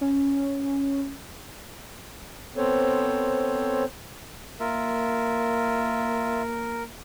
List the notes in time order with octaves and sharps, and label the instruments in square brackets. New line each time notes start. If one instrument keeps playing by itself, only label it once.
[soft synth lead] C#4
[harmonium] B3 C4 A4 C5 C#5
[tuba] A#3 [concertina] F4 E5 [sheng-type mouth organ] A#4